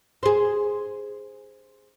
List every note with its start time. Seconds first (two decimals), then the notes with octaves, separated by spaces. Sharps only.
0.23 G#4 C5